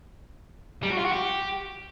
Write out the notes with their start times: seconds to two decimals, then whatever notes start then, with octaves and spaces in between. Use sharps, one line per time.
0.83 G3
0.90 F#4
0.97 F4
1.05 F#4
1.12 G4